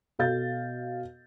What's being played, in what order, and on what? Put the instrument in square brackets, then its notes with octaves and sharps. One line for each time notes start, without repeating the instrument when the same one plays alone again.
[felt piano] B2 A4 F5 G6 A6